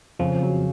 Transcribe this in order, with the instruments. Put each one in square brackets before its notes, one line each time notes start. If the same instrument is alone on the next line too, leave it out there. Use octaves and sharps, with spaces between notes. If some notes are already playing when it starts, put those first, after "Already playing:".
[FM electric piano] F2 F3 [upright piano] C#3
[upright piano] F#3